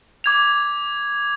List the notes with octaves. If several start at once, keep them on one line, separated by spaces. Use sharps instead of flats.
D6 G#6 F7